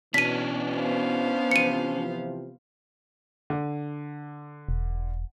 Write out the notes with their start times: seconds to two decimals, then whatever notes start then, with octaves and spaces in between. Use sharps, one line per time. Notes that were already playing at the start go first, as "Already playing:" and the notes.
0.14 B2 E3 C#4 D4 B6 D#7
0.76 B3 C5 F5
1.51 C3 E3 F3 C#7 D#7
3.50 D3
4.69 E1